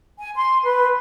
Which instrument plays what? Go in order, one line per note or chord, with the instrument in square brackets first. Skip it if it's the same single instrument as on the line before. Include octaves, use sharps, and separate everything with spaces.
[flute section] G#5
C6
B4